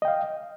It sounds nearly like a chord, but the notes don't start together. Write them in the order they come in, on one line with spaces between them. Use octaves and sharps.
D#5 G5 F5